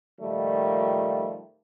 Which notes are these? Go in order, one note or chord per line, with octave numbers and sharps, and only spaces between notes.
A#2 D#3 F3 G3 A3